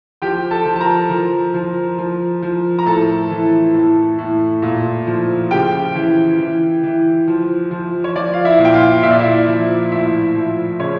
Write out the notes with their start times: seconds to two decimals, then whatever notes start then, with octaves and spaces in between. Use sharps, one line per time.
0.22 F3 G4 G5
0.51 A4 A5
0.66 F3
0.76 A5
0.80 A#4 A#5
1.09 F3
1.54 F3
1.98 F3
2.42 F3
2.79 A#5
2.86 A2 A4 A5
3.31 E3
3.74 A2
4.18 A2
4.62 A#2
5.07 F3
5.51 C#3 G4 G5
5.95 E3
6.39 E3
6.83 E3
7.28 F3
7.71 F3
8.04 C#5
8.15 F3 D5
8.34 F5
8.45 E4 E5
8.59 A#2
8.65 G5
8.74 F4 F5
9.03 A#2 E5
9.11 D5
9.19 E4 E5
9.48 F3
9.92 A2 E4 E5
10.35 F3
10.80 C#3 C#5